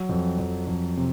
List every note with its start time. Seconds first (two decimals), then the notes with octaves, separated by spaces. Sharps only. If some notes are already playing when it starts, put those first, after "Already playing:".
Already playing: F#3
0.09 F2
0.39 F2
0.67 F2
0.97 C3